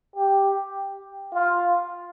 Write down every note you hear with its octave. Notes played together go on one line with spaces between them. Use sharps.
G4
F4